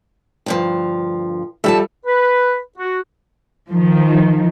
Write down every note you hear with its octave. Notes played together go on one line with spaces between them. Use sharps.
D2 G2 F3
F3 G3 A4 E5 G5 A5
B4
F#4
D#3 F3